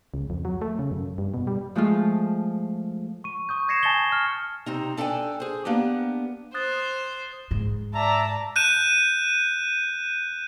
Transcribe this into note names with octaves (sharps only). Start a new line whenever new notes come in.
C#2
F2
F#3
A3
C#3
F#2
G2
B2
G3
F3 G#3 A3 F4
C#6 D#7
C#6 D#6 G6
G6 G#6 A#6 C7 C#7 E7
G#5 A5 G#6 A6 E7 G7
F6
C3 C4 D#4
D4 A4 E5 F5 G5 G#5
G#4 C5
A#3 B3 D4 G4
C5 D#6 F#6 A6
G#2
D5 E5 A5 A#5
F#6 G6 D#7 E7